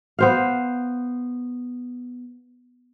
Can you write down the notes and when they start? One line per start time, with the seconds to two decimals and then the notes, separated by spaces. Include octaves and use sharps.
0.19 B3 C5 F5